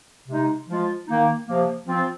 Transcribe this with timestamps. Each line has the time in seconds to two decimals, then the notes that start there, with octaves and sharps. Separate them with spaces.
0.29 C3 G#3 D#4
0.69 F3 G#3 F4
1.07 D#3 A#3 D#4
1.47 C3 F3 A#3
1.87 F3 C4 F4